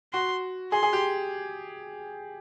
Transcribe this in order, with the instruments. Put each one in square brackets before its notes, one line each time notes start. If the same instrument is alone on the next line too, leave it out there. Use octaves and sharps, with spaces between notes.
[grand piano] F#4 [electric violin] C6
[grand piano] G#4 [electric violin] C6
[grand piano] G#4
G4